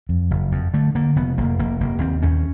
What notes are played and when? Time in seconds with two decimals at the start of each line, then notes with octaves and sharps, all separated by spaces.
0.09 F2
0.31 F#1
0.52 F2
0.74 D3 A3
0.95 D3 A#3
1.16 F1 B3
1.38 F1 A#3
1.59 F1 A#3
1.80 F1 A#3
2.01 D#2 C4
2.22 D#2 C#4